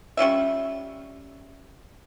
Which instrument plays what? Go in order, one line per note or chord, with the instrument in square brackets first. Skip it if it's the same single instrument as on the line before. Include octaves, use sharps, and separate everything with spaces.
[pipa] G3 C#4 F4 E5